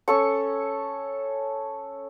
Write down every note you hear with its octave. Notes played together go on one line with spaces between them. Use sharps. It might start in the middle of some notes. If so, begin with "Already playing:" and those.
C#4 A4 C#6